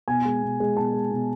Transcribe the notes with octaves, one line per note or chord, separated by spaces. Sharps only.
B2 G#5
G#3
B2
G#3
B2 A5
G#3
B2